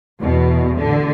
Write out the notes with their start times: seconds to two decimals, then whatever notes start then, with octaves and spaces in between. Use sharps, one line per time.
0.20 E2 B2
0.78 A1 D3